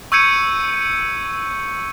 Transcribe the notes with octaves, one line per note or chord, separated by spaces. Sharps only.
C#6 E6 G6 G#6 C#7 D#7